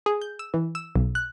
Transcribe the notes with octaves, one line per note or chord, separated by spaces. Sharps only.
G#4
G6
E6
E3
E6
B1
F#6